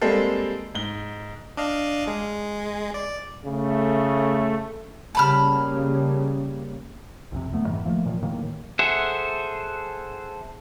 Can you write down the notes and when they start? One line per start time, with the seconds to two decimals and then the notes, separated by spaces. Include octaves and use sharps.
0.01 G3 G#3 A#3 C4 A4
0.75 G#2 G7
1.57 D4 D#5 F5
2.07 G#3
2.94 D5
3.45 C#3 A3
5.15 C#3 G3 A#3 A5 B5 F6
7.32 B1 F2 C3
7.53 D2 F#3 A3 B3
7.66 F2 G#2 D#3 E3
7.85 F3 A3 A#3
8.05 A#2 D#3 F3 F#3
8.22 A2 D#3 F#3 A#3
8.79 G#4 A4 C5 E5 F#5